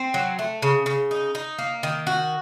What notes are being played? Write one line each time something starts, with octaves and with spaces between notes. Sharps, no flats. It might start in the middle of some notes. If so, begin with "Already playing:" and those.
Already playing: C4
F#3
A3
C#3
C#3
D#4
D#4
A#3
D#3
F#4